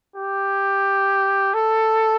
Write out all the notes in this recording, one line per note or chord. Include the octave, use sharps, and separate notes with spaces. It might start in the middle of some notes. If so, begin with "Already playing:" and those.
G4
A4